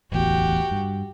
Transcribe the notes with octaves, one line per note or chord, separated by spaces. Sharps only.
D1 A1 E2 F#4 G4
G2